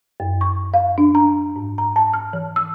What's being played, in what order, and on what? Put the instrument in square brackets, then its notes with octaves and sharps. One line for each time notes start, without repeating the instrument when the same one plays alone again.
[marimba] F#2
C#6
F5
D4
A#5
G#2
A#5
A5
F6
E3
E6